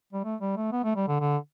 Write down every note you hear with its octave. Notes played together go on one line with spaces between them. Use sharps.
G3
A3
G3
A3
B3
A3
G3
D3
D3